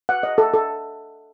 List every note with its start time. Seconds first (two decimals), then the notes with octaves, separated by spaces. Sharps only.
0.09 F#5
0.23 D#5
0.38 A4
0.54 A4